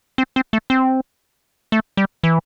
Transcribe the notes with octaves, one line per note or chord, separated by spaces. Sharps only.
C4
C4
A3
C4
A3
G3
E3